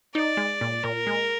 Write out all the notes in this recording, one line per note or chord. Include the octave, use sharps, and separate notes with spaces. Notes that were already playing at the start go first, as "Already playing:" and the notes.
D#4 D5
G#3
A#2
A#2 A#4
G#3